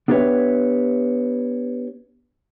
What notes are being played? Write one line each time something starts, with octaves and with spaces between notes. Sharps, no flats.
B3 D4 G4 B4 C#5 E5